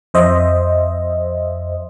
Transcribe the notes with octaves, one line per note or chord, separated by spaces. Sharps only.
F2 C5 D#5 E5